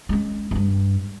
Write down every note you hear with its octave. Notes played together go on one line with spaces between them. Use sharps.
G#3 C#4
G2 G3